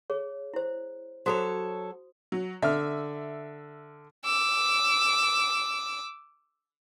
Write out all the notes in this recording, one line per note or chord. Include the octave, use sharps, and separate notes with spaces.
G#4 C#5
E4 C5
F#3 F#4 A4 C5 C#5 D#6
F#3
D3 E5 F6
D6 E6